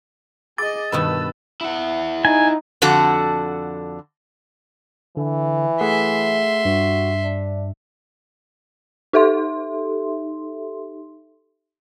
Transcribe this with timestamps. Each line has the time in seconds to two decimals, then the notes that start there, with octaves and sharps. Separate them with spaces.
0.58 G#4 D#5 D6 A6
0.92 G2 B2 D#3 B4 E6
1.61 E4 F#5
2.25 D#4 G#5
2.82 F2 D3 F#4 A4
5.17 D3 E3
5.81 A3 G#4 E5 F#5 C6
6.65 G2 F#4
7.23 D4
9.13 D#4 G4 A4 E5 C6